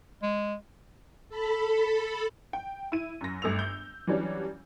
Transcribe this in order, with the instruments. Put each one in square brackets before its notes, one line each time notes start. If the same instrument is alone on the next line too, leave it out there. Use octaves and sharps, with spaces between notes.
[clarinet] G#3
[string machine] A4 B5
[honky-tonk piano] G5
E4 D#7
F#2 A#6
G1 A3 E6 F7
G6
E3 F#3 G3 C#4 D4